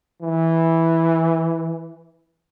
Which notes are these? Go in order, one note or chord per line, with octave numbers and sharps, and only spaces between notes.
E3